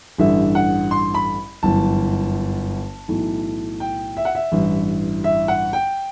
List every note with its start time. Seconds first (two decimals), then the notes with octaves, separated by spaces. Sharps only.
0.18 A1 G2 D3 E5
0.55 F#5
0.91 C6
1.15 B5
1.63 G1 F#2 E3 A5
3.08 B1 A2 E3
3.80 G5
4.17 E5
4.25 F#5
4.35 E5
4.52 A1 G2 E3
5.24 E5
5.48 F#5
5.73 G5